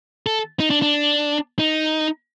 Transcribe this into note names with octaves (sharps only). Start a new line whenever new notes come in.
A4
D#4
D4
D4
D#4